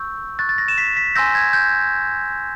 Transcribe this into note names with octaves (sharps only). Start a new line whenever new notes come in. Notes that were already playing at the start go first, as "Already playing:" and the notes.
Already playing: C#6 E6 G6
C#6 F#6 A6
A6
A#6
E7
B6
B6
G#5 C6 E6 G6 A#6
G#6
G6